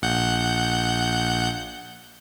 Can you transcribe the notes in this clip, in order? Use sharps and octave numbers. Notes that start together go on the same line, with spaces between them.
A#1 F#5 G6